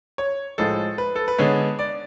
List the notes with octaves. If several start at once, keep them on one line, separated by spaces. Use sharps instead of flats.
C#5
A2 F3 G#3 A4
B4
A4
B4
D3 G#3 B3 C#5
D5